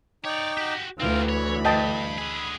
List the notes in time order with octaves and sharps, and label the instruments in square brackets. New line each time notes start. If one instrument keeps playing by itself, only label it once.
[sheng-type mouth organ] D#4 G5 D6 [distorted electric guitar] C#5 D5
[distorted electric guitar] F#4 G4
[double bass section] D2 E3 [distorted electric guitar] C4 A#4 [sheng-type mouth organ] F4
[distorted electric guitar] C#5 [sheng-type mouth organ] B5
[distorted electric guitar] G2 [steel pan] D#5 G5 A5
[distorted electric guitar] D3 G#4